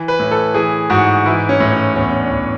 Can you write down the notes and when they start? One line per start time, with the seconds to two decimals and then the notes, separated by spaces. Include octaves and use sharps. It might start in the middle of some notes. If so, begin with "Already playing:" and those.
Already playing: E3
0.08 B4
0.20 A2
0.31 A4
0.54 E3 G#4
0.90 G#2 F#4
1.26 E3 E4
1.49 C#4
1.60 A2
1.73 C#4
1.96 E2 C#4
2.12 C#4
2.20 D4
2.31 E2